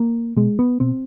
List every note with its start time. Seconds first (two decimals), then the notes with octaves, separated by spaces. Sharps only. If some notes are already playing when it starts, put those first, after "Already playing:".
Already playing: A#3
0.36 B2 G#3
0.59 B3
0.80 B2 C4